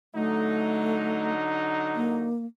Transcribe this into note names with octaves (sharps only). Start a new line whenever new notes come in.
D3 F#3 A3 D#4
A#3